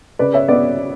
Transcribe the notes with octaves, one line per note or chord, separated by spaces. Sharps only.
C#3 B4 D5
C#5 E5
B3 B4 D5